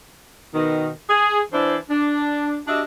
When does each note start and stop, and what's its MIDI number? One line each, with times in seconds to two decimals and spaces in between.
0.54 0.89 47
0.54 0.89 51
1.10 1.39 68
1.53 1.76 52
1.53 1.76 62
1.53 1.76 64
1.53 1.76 72
1.90 2.60 62
2.67 2.82 62
2.67 2.82 66
2.67 2.82 67
2.67 2.82 75
2.67 2.82 76